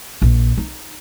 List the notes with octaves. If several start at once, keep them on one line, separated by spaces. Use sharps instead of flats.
A#1
D#4